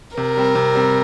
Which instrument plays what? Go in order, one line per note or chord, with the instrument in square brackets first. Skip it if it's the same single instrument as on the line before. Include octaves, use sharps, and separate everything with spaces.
[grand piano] C3 [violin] A#4
[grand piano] G3 C4
C3
G3 C4